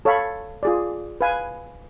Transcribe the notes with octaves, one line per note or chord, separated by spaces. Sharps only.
A4 C#5 F5 B5
F4 G#4 D5
B4 F5 G#5